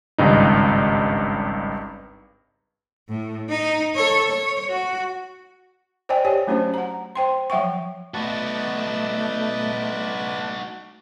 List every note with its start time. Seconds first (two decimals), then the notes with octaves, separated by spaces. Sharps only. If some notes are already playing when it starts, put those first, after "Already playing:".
0.18 G#1 C#2 G2 D#4
3.09 A2
3.49 D#4
3.95 A4 C#5
4.30 C#5
4.70 F#4
6.09 C5 D5 D#5 G5 G#5
6.25 G4 C#5 D5 G#5
6.47 F#3 A3 C#4 D4 F#4 C5
6.74 F#5 A#5
7.16 C5 G5 C6
7.50 F3 F#3 E5 F#5 G5 C#6
8.14 A3 D#4 F#4 B4 D5 A5